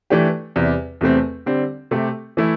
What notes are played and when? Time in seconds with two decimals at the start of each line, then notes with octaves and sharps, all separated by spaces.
0.10 E3 A3 D4 G4
0.56 E2 C3 G3
1.01 E2 C3 A3 C4
1.46 D3 G3 C4
1.91 C3 A3 C4 G4
2.37 E3 A3 E4